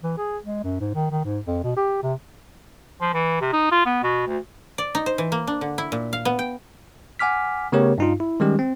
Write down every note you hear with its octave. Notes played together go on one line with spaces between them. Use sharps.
E3
G#4
G#3
F#2
G#2
D#3
D#3
G#2
F2
B2
G4
C3
F3
E3
C3
D#4
F4
B3
B2
D2
D5
D#4
C5
E3
A#3
D4
D3
E4
A#2
F5
B3
G5
F#5 G#5 D6 F6 B6
C#3 A3 B3 G4 A#4 C#5
G2 D#4 F4
E4
D#3 G3 G#3 C#4 G4
C4